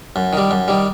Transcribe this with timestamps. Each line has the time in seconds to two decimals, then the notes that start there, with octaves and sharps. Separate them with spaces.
0.16 F#2
0.33 D#3 G3
0.51 F#2
0.68 D#3 G3